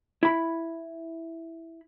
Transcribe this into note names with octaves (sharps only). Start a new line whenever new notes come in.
E4 B5